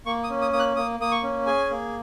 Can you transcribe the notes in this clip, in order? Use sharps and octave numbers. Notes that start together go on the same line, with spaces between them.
A#3 C#6
D#6
C#4
D#6
A#3 D#6
F#6
A#3 D#6
A#3 D#6
C#6
C#4
G#4 G#5
A#3